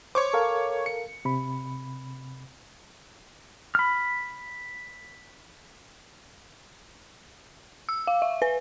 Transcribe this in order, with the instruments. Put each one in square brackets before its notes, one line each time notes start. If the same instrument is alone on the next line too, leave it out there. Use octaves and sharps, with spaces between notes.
[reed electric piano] C5 [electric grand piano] C#5 C#6 D6
[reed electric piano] A4 A#4 F5
[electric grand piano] C#7
[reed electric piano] C3 B5
[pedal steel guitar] B5 F6
[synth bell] E6
F5
E5
B4